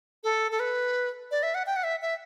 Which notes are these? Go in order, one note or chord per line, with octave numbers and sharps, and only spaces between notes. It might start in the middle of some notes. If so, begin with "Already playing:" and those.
A4
A4
B4
D5
E5
F#5
G5
F#5
E5
E5